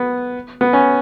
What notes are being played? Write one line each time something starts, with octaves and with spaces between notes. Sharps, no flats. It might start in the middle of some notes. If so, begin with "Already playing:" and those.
Already playing: B3
B3
C#4